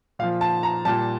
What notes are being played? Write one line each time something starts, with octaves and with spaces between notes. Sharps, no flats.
A#2 F3 F5
A5
A#5
A#2 G3 A5